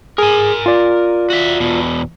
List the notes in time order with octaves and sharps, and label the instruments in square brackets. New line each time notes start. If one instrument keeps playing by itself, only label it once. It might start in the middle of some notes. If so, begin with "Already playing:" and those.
[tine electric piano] G#4 [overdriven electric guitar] A#4 G#5
[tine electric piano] F4 D5
[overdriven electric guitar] F#4 E5
E2 B2